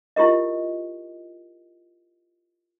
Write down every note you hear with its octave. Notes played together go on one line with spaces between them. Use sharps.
E4 F4 G4 A#4 D#5